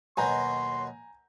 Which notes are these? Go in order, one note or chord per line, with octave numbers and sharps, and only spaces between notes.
D#2 B2 F#3 G#5 A#5 C6 G6